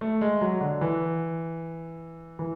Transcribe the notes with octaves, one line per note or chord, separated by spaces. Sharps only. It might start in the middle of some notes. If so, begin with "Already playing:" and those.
A3
G#3
F#3
D3
E3
E3